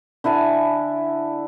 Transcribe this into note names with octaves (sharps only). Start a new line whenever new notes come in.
D3 E4 G#5 A5